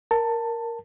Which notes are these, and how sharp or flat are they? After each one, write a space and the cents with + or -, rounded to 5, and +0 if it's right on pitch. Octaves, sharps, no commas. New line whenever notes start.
A#4 +0 A5 +15